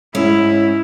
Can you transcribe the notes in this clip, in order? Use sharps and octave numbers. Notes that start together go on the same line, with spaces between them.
G#2 C#4 E4